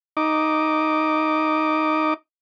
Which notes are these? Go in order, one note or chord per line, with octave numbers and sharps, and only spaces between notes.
D#4 D6